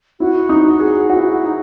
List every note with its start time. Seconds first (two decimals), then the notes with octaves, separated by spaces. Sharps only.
0.20 E4 F#4
0.49 D#4
0.80 G#4
1.10 E4 F#4
1.46 D#4